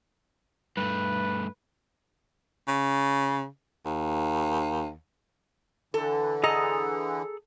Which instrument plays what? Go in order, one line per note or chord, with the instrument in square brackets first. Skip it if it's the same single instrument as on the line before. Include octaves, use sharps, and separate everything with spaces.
[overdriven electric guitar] G2 A3 [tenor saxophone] B4
[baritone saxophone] C#3
D#2
[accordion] D3 E3 [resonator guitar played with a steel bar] A4
[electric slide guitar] G#4 A4 A#5 [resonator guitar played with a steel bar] D#5